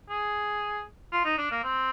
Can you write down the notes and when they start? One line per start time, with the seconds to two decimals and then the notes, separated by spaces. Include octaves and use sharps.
0.09 G#4
1.12 F4
1.25 D#4
1.38 D4
1.51 A#3
1.64 C4